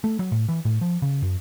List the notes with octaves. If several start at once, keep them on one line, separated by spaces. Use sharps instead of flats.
A3
F#3
A2
E3
A2
F3
C#3
F#2